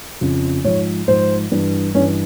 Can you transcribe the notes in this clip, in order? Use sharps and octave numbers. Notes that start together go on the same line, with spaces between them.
F2 C#3 F3
G#2 F3 C#5
G#2 F3 C5
G2 E3
G2 E3 C#4